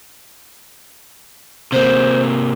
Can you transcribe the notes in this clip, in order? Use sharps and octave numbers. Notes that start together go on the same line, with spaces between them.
C3 A#3 C5